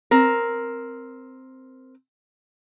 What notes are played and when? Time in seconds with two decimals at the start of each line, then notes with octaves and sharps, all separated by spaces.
0.11 C4 A#4